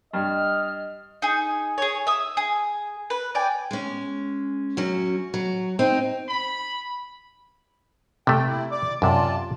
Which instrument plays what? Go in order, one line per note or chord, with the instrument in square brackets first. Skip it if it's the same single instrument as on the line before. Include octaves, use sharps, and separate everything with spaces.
[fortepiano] G2 [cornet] D#5 [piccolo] F6
[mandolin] D#4 G#4
G#4 C#5
E5 D#6
G#4
B4
D5 G5 G#5
[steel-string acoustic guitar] G#3 C#4
F#2 F#3 C#4
F#3
C4 D#4
[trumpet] B5
[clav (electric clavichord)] C3 A3 [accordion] G5
[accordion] E4
D5 D6
[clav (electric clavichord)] F#2 C3 [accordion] F4 D5 A5